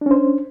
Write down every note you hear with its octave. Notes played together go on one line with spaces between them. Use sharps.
C#4 D4 C5